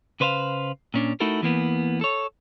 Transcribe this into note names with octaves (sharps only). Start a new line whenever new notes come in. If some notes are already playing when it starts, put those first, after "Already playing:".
C#3 B4 C5 E5 F5
A#2 C#4 D4
A3 D#4 E4 F#4 A4 A#4
E2 E3 A#3 B3
A4 C#5